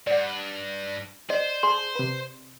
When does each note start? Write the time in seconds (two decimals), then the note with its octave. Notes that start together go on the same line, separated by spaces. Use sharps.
0.07 G2 D5 F#5
1.30 C5 D5 D#5
1.63 G#4 A5 C6
1.96 C3 B4